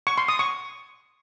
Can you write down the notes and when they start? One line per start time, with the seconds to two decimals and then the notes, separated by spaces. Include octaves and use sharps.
0.07 C#6
0.18 C6
0.28 D#6
0.39 C#6